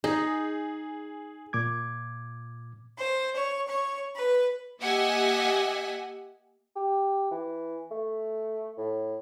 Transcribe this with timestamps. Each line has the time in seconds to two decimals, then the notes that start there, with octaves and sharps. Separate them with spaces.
0.04 D#4 G#4
1.53 A#2 D6 G#6
2.97 C5
3.36 C#5
3.66 C#5
4.15 B4
4.81 A#3 G4 D#5 E5 F#5 G#5
6.76 G4
7.31 E3
7.91 A3
8.78 A2